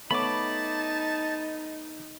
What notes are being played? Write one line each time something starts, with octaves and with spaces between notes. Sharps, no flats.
A3 B3 D#4 C#5 A5 B5 D6